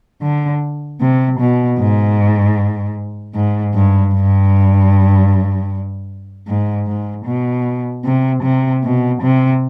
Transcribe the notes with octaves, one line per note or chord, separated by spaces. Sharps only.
D3
C3
B2
G#2
G#2
G2
G2
G#2
G#2
B2
C3
C3
B2
C3